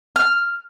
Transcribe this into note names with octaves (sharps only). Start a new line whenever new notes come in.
F6